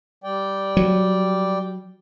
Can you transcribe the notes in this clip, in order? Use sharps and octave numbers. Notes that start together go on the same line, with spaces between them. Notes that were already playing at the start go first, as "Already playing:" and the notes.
G3 D5 G5
F#3